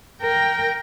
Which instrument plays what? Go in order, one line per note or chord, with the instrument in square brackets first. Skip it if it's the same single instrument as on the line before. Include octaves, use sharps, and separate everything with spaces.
[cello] A#4 G5